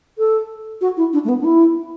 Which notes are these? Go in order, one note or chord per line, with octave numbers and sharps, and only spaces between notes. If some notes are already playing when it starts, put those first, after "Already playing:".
A4
F#4
E4
D4
A3
B3
D4
E4